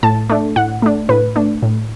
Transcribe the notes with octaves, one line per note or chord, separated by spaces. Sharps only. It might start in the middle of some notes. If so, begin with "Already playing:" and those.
A2 A5
A3 D4
A2 F#5
A3 D4
A2 B4
A3 D4
A2